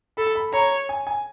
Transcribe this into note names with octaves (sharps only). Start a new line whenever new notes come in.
A4 B5
B5
C#5 A#5
G#5
G#5